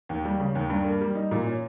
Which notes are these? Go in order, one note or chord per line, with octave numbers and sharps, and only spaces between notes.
D#2
G3
C#3
D#2
G2
A#3
G3
D#4
A#2
C#4